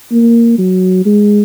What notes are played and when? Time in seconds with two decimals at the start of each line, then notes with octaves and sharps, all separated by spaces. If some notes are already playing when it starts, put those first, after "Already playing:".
0.12 A#3
0.58 F#3
1.05 G#3